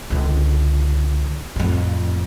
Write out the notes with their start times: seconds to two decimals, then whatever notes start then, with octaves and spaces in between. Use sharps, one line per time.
0.10 C#2 D3
1.56 F2 A2